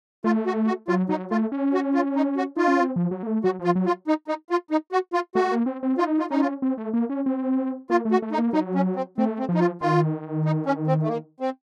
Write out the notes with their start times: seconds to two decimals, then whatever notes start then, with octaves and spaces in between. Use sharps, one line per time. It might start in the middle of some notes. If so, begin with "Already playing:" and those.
0.24 A3 F4
0.46 F#4
0.67 F#4
0.88 F#3 F4
1.09 F#3 D#4
1.31 A3 F4
1.52 C#4
1.74 F#4
1.94 F4
2.16 D#4
2.37 F#4
2.57 D#4 F4
2.68 C#4
2.80 C4
2.96 F3
3.11 F#3
3.23 A#3
3.27 A3
3.44 F#3 F#4
3.59 F3 F4
3.75 F#3
3.86 F4
4.08 D#4
4.28 D#4
4.50 F4
4.71 D#4
4.92 F#4
5.13 F4
5.35 A3 F#4
5.51 A#3
5.66 C4
5.83 C4
5.98 D#4 F4
6.20 F4
6.30 C#4 D#4
6.41 F4
6.62 C4
6.78 A3
6.94 A#3
7.09 C#4
7.26 C4
7.90 A#3 F4
8.05 A3
8.11 F#4
8.22 A3
8.32 D#4
8.38 A#3
8.53 F#3 D#4
8.75 C#4
8.96 C4
9.18 A3 C4
9.39 C4
9.49 F3
9.54 D#4
9.60 F4
9.81 D#3 F4
10.45 D#4
10.66 C#4
10.87 C4
11.03 A3
11.08 A#3
11.40 C4